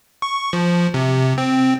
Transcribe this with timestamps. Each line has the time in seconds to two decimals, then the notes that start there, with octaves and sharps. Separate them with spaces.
0.22 C#6
0.53 F3
0.94 C3
1.38 C4